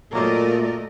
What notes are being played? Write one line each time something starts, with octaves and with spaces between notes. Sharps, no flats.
A#2 F#3 A3 A#3 A#4 C5 D5 D#5